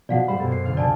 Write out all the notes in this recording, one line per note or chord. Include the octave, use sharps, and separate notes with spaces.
B2 F3 F#4 D5 F5 F#5
F#2 G3 C5 B5
F#2 B2 A#3 A4
C7
D2 F5
C3 F3 D5 G#5 A5